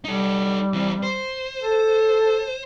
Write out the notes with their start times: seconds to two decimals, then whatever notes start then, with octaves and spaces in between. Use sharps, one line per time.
0.05 G3 D#4 A4
0.73 E3 C4
1.03 C5
1.62 A4